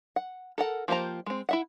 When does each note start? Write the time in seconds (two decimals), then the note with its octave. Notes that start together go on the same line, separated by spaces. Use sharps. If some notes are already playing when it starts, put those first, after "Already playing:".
0.16 F#5
0.58 A4 A#4 F#5
0.88 F3 A#3 G4 C5 A#5
1.26 G#3 C4
1.49 E4 E5 F#5